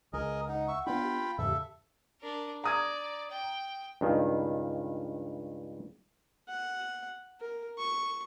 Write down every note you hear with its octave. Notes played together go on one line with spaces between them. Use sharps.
C#2 G#4 A#4 D#5
D#4 F#5
E5 C#6
B3 C#4 D4 F4 G5 B5
G4
E2 G#2 C#3 A4 E5
D4 A#4
D5 A#5 D#6 G#6
G5
C#2 G2 D#3
F#5
A#4
C#6